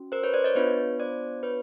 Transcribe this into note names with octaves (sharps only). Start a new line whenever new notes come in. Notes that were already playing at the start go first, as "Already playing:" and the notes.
Already playing: C#4 F#4
A#4 C5
B4 C#5
C5 D5
C#5 D#5
B3 D4 F4 B4 C#5
C5 D5
B4 C#5